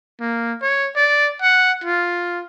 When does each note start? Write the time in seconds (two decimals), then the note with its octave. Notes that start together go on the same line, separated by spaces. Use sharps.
0.20 A#3
0.62 C#5
0.96 D5
1.42 F#5
1.84 F4